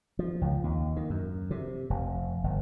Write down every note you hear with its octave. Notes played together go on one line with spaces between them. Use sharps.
F3
C#2
D#2
D#3
F#2
C3
F1
G1